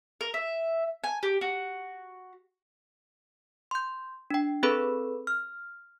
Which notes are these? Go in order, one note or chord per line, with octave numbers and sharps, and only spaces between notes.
A#4
E5
G#5
G4
F#4
C6 G6
D4 G5
C4 G#4 A4 B4 B5
F6